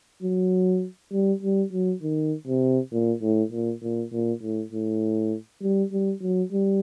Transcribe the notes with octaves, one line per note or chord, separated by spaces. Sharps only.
F#3
G3
G3
F#3
D#3
C3
A#2
A2
A#2
A#2
A#2
A2
A2
G3
G3
F#3
G3